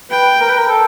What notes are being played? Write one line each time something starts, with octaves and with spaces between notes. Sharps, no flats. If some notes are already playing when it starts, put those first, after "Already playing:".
B4 G5
A#4
B4
A#4
A4